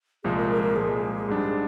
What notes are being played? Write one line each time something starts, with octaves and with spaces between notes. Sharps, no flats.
C2 A#2 F3 G#3 G#4
A#4
A#4
A#4
C2 A#2 F3 G#3 G#4
G#2 G3 D4